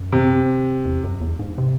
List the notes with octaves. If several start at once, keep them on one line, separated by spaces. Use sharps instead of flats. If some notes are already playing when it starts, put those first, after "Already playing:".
Already playing: F#2
C3
E2
F#2
E2
G#2
C3